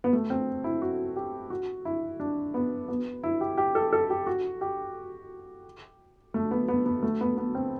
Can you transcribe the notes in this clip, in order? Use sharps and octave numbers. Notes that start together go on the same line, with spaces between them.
B3
A3
C4
E4
F#4
G4
F#4
E4
D4
B3
B3
E4
G4
G4
A4
A4
G4
F#4
G4
A3
B3
B3
B3
A3
B3
B3
C4